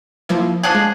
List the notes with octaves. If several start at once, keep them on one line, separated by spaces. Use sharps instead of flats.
F3 A#3 E4
F3 D4 G#4 F#5
G#3